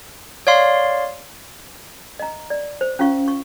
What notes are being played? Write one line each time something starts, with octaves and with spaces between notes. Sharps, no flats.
C#5 D5 F5 C6
D#5 A#5
D5
C5
C#4 F4 F5 C#6
C#6